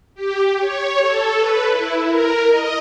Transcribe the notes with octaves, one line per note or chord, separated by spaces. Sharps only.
G4
C#5
A4
B4
E4
A#4
D#5